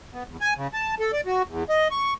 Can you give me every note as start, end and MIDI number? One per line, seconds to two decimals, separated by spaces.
0.14 0.23 59
0.28 0.37 40
0.41 0.54 80
0.57 0.67 49
0.73 0.95 81
1.00 1.12 69
1.13 1.21 74
1.26 1.42 66
1.49 1.64 40
1.69 1.88 75
1.91 2.14 85